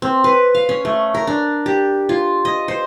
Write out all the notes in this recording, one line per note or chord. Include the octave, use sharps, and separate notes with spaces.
C4
B4
F5
C#4
A3
A#4
D4
G4
F4
D#5
C5